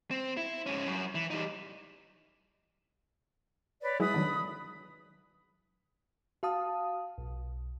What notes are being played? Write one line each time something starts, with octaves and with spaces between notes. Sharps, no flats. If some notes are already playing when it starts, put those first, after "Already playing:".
C4
E4
G#2 C#4
F#2
E3
G3 D#4
B4 C#5 D5
F#3 G#3 E4 B4 B5 D#6
D3 D#3 F#3
F#4 F5 A5 D#6
B1